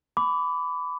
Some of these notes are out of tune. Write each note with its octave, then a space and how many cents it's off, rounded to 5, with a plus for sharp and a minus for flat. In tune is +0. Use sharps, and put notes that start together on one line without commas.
B5 +20 D6 -20